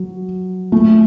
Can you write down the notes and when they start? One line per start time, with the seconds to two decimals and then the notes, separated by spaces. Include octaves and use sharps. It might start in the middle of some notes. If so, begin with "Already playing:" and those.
Already playing: F#3
0.72 A3